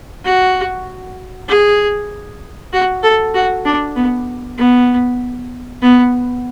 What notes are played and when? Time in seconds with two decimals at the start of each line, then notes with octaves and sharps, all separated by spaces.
0.25 F#4
1.48 G#4
2.73 F#4
3.03 A4
3.34 F#4
3.65 D4
3.96 B3
4.58 B3
5.82 B3